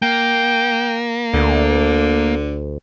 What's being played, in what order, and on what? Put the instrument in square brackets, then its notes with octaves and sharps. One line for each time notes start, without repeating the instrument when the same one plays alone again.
[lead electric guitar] A#3 [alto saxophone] G5
[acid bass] D2 [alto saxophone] D3